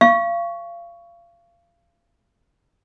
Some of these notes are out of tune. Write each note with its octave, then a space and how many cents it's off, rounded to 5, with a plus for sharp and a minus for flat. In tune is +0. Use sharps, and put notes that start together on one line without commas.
F5 -30 C#6 +5